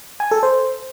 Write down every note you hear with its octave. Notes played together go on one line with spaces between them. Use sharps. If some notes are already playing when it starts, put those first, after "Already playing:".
G#5
A4
C5